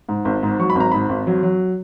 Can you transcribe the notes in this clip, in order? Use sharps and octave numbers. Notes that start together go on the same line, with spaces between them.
G#2
G#1
G#2
F#3 C#6
B5
G#1 A#5
G#2 B5
G#1
F#3
F#3